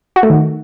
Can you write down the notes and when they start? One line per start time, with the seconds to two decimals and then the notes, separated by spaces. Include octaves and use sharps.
0.16 F#4
0.23 A3
0.30 D#3